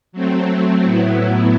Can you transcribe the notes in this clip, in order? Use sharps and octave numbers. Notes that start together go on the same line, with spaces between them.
F#3 A3 C4
A2 F#3 B3 E4